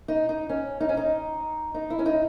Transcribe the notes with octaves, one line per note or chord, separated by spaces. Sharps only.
D#4
D#4
C#4
D#4
C#4
D#4
D#4
E4
C#4
D#4